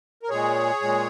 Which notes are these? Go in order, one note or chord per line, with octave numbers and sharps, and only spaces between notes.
A#4
A#2 G#3 G#4 C#5
A#2 G#3